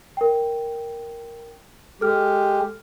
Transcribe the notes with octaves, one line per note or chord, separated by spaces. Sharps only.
A#4 G5
G#3 G4 A4 F6